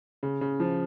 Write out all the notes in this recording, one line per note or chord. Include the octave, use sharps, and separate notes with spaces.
C#3
C#3
F3